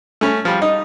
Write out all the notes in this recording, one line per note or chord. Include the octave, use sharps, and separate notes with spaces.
A3 C#4
F3 G3
D#4